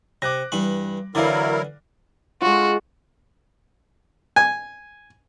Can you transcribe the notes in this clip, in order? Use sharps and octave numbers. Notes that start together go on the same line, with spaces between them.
C3 D6 F#6 A#6
G2 E3 B5
D3 E3 F#3 E4 A#4 D5 F5
G#3 F4 F#4
G#5